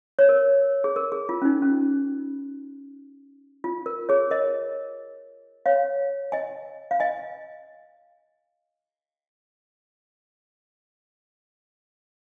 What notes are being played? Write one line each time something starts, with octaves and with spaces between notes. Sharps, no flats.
C#5
A#4
G#4
A#4
G#4
F4
C#4
D#4
C#4
F4
A#4
G#4 C#5
A#4 D#5
C#5 F5
D#5 G#5
F5
D#5 G#5